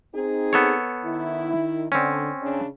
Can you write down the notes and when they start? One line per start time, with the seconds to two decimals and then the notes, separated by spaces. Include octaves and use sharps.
0.14 C4 D#4 G#4
0.53 B3 A4 C#5
1.04 D#3 E4
1.92 D3 C4 C#4
2.43 C#3 D4